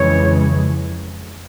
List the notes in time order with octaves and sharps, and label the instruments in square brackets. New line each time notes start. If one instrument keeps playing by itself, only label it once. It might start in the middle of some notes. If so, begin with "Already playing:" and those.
Already playing: [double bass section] F2 C#3 E3 G#3 [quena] C#5